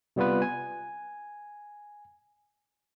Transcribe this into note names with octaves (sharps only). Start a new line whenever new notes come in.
C3 G3 B3 F4 B4
G#5